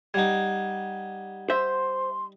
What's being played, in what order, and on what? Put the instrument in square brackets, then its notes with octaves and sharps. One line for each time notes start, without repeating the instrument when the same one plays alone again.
[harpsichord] G3 D#4 [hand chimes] F#5 G#6
[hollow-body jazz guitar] C5 E5 [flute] C6